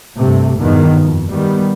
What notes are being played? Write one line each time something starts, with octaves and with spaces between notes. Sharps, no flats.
G2 C3 A3
E2 G2 B2 D#3
F2
D#3 G3 B3